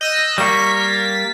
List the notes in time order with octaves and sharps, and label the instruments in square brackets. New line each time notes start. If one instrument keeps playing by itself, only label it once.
[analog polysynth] D#5 E6 F#6 [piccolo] G6
[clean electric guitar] G3 A#3 [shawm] A#4 [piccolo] C#6 [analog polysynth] B6
[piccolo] A6